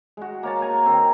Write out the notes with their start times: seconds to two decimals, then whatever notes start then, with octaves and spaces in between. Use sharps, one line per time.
0.17 G#3 F#4
0.43 A#3 C#5 A5
0.62 G#5 A#5
0.85 D#3 C4